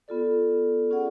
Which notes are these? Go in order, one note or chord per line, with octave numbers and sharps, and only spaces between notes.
B3 F4 A4 D5
C#4 F4 G#4 D5 F#5